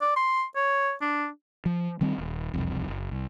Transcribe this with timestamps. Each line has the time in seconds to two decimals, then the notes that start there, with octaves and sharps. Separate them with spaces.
0.01 D5
0.16 C6
0.56 C#5
1.01 D4
1.66 F3
2.01 D#3 G3 C4
2.18 D#1
2.54 E1 C2 F2
2.88 F#1
3.12 C2